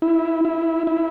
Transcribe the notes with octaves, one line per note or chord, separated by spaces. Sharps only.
E4
E4
E4